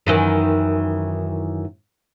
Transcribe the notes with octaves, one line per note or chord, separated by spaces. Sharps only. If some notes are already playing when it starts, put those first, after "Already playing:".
F#2 D#3 E3